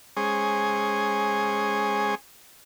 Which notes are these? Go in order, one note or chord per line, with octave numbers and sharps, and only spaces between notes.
G#3 C#4 G#4 C5